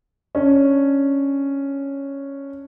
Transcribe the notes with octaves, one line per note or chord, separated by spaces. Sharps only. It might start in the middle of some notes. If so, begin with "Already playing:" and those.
C#4 D4